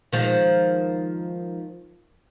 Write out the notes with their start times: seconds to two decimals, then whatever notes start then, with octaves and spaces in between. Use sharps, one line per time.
0.12 D#3 F3 G#3